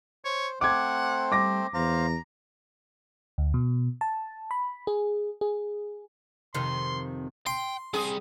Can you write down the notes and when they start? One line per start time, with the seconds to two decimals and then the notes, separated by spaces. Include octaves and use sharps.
0.25 C5 C#5
0.61 A3 C4 C5 F#5 D6 G#6
1.32 G3 D6 A#6
1.74 E2 C5 F5 A#5
3.38 D2
3.54 B2
4.01 A5
4.51 B5
4.87 G#4
5.41 G#4
6.54 F2 C3 D#3 C6
7.47 G5 C6
7.94 G3 C4 G#4